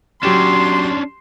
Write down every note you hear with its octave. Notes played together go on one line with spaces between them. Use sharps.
F#3 C#4 D4 G4 C6 E7